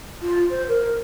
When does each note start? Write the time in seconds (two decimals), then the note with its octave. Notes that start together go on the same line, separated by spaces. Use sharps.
0.22 F4
0.50 C5
0.68 A#4